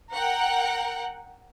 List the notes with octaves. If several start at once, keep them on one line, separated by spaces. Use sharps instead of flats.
A#4 F#5 G5